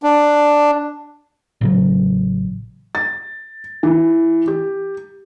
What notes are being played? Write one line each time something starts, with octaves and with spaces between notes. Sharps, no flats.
D4
A1 C#3 F#3
A6
E3
G4